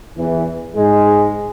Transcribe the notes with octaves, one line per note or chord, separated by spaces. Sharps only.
E2 E3
G#2 G#3